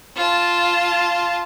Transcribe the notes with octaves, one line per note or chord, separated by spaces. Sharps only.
F4 A5